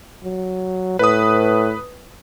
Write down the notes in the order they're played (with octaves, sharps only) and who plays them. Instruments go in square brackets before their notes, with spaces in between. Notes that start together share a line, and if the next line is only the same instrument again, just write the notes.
[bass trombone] F#3
[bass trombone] A2 [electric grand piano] B4 D#6